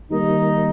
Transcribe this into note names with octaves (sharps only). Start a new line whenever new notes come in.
D#3 G3 A#3 D#4